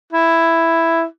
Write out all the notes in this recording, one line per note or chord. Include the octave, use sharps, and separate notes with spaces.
E4